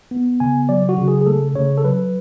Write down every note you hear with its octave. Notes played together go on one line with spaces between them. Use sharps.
B3
C#3 G#5
F#3 D5
F#4
C#3
G#4
G#4
A3 A4
C#3 C#5
A4
F#3 B4